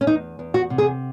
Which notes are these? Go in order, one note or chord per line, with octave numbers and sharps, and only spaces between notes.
C#4
E2 D#4
E2
F#4
C3
G#4